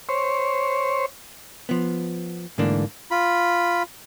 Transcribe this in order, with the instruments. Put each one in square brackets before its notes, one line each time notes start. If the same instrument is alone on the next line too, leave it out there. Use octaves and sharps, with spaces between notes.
[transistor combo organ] C5 C#5
[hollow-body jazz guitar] F3 B3
G#2 D3 E3 A3 A#3 D4
[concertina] F4 B5